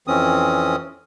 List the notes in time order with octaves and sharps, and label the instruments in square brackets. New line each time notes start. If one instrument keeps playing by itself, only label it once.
[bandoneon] F2 E3 C4 C#4 D#6